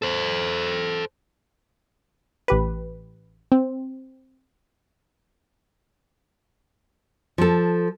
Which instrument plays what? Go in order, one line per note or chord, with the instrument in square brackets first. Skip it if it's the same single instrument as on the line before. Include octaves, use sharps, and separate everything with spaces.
[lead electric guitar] A4 C5
[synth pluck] A1 G4 B4
C4
[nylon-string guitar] F3 A4